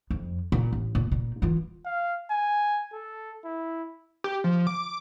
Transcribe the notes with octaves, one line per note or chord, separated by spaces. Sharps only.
F2
A#2
A1
A#2
A#2
E3 F4
F5
G#5
A4
E4
G4
F3
D6